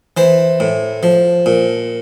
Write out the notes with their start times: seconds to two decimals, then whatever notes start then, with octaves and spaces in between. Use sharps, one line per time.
0.17 E3 C5
0.60 A2
1.03 F3
1.46 A#2